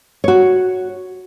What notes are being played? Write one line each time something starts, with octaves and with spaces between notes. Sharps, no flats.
F#4 C#5